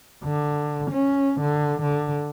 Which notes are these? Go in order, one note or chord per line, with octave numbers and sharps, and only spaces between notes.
D3
C#4
D3
D3